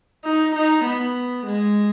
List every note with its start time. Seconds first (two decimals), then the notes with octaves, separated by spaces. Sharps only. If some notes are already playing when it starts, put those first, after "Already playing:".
0.24 D#4
0.55 D#4
0.85 B3
1.46 G#3